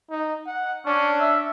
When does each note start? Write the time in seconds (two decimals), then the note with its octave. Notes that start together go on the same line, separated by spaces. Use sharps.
0.11 D#4
0.47 F#5
0.87 C#4 D4
1.20 E5